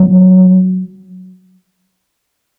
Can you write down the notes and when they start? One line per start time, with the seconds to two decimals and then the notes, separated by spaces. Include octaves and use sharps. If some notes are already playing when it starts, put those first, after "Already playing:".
Already playing: F#3